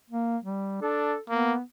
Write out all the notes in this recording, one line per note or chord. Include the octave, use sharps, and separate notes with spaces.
A#3
G3
D4 A4
A#3 B3